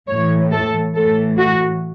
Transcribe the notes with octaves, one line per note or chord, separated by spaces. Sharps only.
A2 E3 C#5
A4
A2 E3 A4
F#4